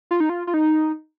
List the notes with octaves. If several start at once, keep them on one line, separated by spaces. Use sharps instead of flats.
F4
D#4
F4
F4
D#4